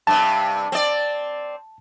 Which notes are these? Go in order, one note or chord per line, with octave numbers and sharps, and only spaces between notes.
G2 C3 A5
C4 D5